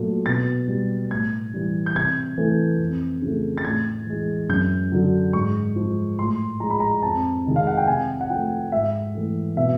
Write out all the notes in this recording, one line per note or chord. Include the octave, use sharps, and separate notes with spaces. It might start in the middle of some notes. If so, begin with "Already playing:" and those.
Already playing: A#2 F#3 A3
B2 A6
G3
A2 G#6
E3 G3
G6
C3 G#6
E3 A3
F2
C#3 F3 A3
A6
A2 G#6
E3 G#3
F#2 G6
D3 F#3
G#2 C#6
F3 G#3
A2 C6
F3 G#3 A#5
B5
A#5
F2 A5
C3 D#3 G#3
F5
F#5
G5
C3 G#5
F#5
F3 A3 G5
G#2 E5
E3 A3
B2 E5